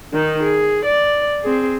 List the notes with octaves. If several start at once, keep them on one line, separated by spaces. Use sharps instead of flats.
D#3 D#4
G#4
D5
C4 G#4